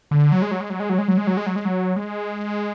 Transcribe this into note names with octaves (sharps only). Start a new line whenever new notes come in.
D3
F#3
G#3
F#3
G#3
F#3
G#3
F#3
G#3
F#3
G#3
F#3
G#3
F#3
G#3
F#3
G#3